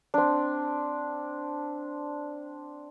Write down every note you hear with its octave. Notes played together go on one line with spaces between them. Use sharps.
C4 D4